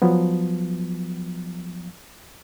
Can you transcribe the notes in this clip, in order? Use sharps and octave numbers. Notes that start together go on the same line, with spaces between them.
F3 F#3 B3